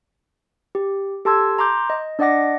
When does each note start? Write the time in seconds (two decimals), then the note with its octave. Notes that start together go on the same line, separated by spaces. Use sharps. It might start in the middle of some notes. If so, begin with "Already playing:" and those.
0.75 G4
1.25 G4 A4 A5 C6 E6 G#6
1.59 A#5 C6 D6 G6
1.90 D#5
2.19 D4 D5 D#5 F#5 D6 A#6